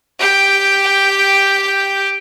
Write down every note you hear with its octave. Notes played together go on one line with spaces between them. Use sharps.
G4 G5